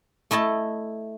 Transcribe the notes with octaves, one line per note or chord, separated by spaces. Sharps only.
A3 E4 D#5 A5